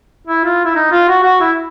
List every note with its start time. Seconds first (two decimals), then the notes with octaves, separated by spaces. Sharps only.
0.27 E4
0.44 F4
0.65 E4
0.75 D#4
0.91 F4
1.08 F#4
1.23 F#4
1.40 E4